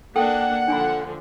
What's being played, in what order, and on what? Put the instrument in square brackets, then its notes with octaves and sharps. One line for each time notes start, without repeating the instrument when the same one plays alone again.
[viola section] A#3 D4 [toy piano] A4 G5 [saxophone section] F#5
[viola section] D3 F3 [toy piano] D4 G#5 B5